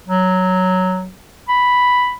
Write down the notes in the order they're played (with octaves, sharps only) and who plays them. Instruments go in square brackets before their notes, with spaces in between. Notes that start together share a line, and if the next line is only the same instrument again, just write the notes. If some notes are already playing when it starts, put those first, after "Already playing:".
[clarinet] F#3
B5